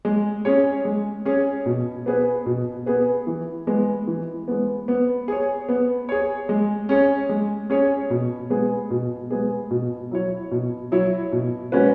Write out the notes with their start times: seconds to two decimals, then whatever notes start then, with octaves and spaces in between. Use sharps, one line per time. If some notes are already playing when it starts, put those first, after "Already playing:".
0.05 G#3
0.45 C#4 G#4 C#5
0.85 G#3
1.25 C#4 G#4 C#5
1.66 B2
2.06 B3 G#4 B4
2.46 B2
2.86 B3 G#4 B4
3.27 E3
3.67 G#3 B3
4.07 E3
4.48 G#3 B3
4.88 B3
5.28 G#4 C#5
5.69 B3
6.09 G#4 C#5
6.49 G#3
6.89 C#4 G#4 C#5
7.29 G#3
7.70 C#4 G#4 C#5
8.10 B2
8.50 G#3 B3 G#4
8.91 B2
9.31 G#3 B3 G#4
9.71 B2
10.11 F#3 E4 C#5
10.51 B2
10.92 F#3 E4 C#5
11.32 B2
11.72 G#3 C#4 F#4 B4